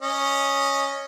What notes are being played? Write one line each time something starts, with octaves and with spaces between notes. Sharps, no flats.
C#4 D#5